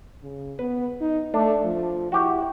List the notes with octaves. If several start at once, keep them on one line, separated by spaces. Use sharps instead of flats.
C#3
B3 B4
D#4
A3 D4
F3
E4 F#4 G4